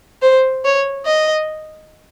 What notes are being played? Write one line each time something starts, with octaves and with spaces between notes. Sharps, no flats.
C5
C#5
D#5